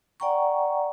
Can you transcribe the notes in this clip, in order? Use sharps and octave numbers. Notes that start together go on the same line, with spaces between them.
D5 F#5 G5 A#5 C#6